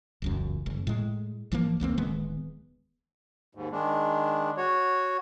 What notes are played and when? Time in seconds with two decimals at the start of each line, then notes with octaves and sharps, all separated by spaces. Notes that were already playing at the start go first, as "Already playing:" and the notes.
0.22 E1 C#2 F#2
0.66 F#1
0.87 A2 G#3
1.52 G#1 E3 F3 A#3
1.80 F1 C#2 A#3 C4
1.97 D1 D#3 G#3 B3
3.55 D#2 G#2
3.72 D#3 G#3 D4
4.57 F#4 C#5